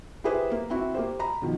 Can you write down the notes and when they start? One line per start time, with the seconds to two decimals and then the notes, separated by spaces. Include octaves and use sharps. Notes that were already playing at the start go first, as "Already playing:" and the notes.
0.24 E4 G4 G#4 B4 C5
0.51 A#3
0.70 C4 E4 F#4
0.95 A#3 G4 C5
1.19 A#5 B5
1.42 B2 D#3 F3